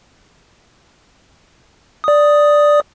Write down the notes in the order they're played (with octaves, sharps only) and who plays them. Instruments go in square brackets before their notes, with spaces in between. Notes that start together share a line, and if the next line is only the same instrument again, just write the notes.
[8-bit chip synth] D5 D#6